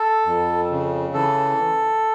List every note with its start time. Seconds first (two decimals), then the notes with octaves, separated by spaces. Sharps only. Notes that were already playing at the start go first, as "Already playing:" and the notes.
Already playing: A4
0.25 F2
0.70 C#3
1.14 E3 A4